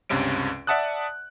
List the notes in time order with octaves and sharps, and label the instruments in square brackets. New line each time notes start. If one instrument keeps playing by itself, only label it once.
[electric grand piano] C#2 G2 C3 C#4 D7
D5 E5 F#5 A5 D#6 F#6